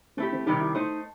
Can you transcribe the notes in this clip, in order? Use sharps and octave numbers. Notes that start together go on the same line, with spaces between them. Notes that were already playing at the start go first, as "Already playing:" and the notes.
A3 C4 E4 G4
C4
C3 D#3 G3 D#4
E4
A3 D#4 A4 C5